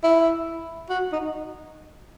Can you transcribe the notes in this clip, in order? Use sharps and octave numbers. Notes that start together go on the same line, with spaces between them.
E4
F#4
D#4